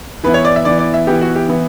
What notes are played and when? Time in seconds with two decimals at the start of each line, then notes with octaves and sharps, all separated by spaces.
0.24 E3 B3 E4 B4
0.34 C#5
0.45 D5
0.56 E5
0.65 E3 B3 E4 D5
0.79 D5
0.94 E5
1.07 E3 B3 E4 G4
1.21 F#4
1.36 G4
1.49 E3 B3 E4